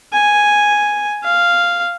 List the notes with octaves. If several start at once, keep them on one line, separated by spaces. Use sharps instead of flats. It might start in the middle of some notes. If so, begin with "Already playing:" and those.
G#5
F5